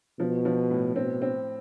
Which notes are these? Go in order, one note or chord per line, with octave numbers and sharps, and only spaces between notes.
B2 F3
F3
A2
B2 C4
C4